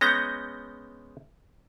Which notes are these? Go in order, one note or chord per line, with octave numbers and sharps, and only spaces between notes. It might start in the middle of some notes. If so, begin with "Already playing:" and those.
G#3 B3 C#4 G6 A#6